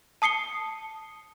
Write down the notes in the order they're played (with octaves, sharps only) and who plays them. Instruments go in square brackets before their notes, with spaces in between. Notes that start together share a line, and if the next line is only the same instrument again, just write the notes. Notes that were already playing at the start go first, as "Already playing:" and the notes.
[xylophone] A5 D#6 C7 C#7 G7